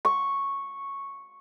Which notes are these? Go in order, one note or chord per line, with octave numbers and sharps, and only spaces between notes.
C#6